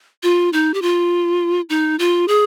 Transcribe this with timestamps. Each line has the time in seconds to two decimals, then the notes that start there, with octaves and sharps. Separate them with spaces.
0.23 F4
0.53 D#4
0.74 G4
0.82 F4
1.69 D#4
1.99 F4
2.28 G#4